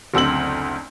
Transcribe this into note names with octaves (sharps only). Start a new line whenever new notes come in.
F#1 D2 C4 E6 F#7